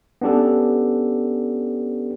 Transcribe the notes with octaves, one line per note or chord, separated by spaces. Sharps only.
B3 C#4 D4 G4 A4